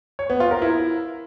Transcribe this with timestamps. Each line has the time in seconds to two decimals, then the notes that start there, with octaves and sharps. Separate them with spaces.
0.19 C#5
0.30 B3
0.40 F4
0.51 A#4
0.62 E4